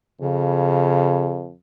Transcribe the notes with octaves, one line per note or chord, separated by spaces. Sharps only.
F2 C#3